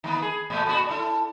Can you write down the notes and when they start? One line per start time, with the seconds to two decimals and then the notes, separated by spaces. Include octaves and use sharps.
0.04 D#3 A#3 B3
0.22 G#4
0.50 A#2 A3 A#3
0.66 A#2 B3 F#4
0.86 E4 A4 D5